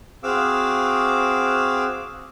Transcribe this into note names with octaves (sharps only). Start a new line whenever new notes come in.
C4 F#4 G#4 F5 D6 E6